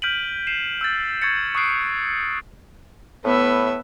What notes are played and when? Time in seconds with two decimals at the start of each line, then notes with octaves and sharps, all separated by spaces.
0.02 F6 G6 B6 D7 D#7 F#7
0.47 C7 D#7 E7
0.81 E6 G6 A6
1.22 C#6 G#6 A6 C#7
1.55 C#6 D#6 F#6 C7 D7
3.24 A2 B3 E5